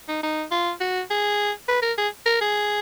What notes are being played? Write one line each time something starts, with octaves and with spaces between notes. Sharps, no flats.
D#4
D#4
F4
F#4
G#4
B4
A#4
G#4
A#4
G#4